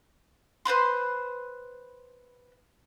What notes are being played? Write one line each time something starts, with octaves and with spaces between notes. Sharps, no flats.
B4 C5 B5 C6